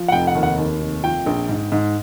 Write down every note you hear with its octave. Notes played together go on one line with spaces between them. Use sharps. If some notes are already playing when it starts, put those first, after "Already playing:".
Already playing: F3
F#5
F1 G5
F#5
D#2
F#5
D#2
F1
F3 G5
A#1
G#2
G#2